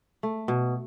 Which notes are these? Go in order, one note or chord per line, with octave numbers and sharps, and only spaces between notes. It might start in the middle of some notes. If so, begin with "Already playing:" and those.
A3
B2